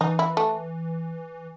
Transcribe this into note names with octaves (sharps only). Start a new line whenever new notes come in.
E3 D#4
E4
A3